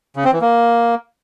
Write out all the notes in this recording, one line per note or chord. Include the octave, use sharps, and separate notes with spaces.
C#3
C4
E3
A#3